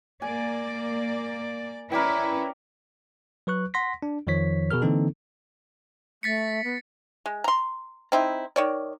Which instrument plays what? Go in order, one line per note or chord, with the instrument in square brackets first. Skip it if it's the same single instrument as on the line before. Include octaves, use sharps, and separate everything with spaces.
[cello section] A#3 D5 [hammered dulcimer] G#5
[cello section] C#4 E4 B4 [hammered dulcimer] A#4 D5 G5
[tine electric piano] F#3 B4 C#6 F#6
F#5 C6 A#6 B6
D4
F2 D#3 F3 C#5 B6
B2 G#4 A#4 F6
D3 E3 A#3 C4 D#4 A4
[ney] A3 [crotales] A6 B6 C#7
[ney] B3
[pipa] G#3
A#5 C6
C4 D#4 E4
D#3 C#5 D5